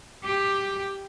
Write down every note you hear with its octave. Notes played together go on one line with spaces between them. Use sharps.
G4